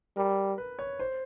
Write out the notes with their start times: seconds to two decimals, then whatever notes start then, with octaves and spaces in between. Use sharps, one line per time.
0.17 G3 A#4
0.58 B4
0.79 C#5
0.99 C5